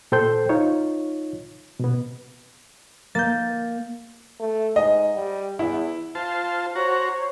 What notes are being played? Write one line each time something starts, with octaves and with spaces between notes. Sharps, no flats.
A#2 A4 C5 G5 C6 G6
D#4 F4 C#5
B2 B3
A#3 G6 A6
A3
G#2 D#5
G3
E2 E4
F4 C5 A5
F#4 C5 C#5 A#5 C#6